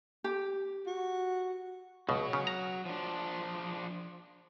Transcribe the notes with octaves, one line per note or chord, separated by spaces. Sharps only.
G4
F#4
C#2 B2 F#3
C#3
A#5
F3 D4